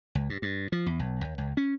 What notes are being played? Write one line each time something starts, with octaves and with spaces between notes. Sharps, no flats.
C#2
G2
G2
F3
E2
B1
D#2
C#2
C#4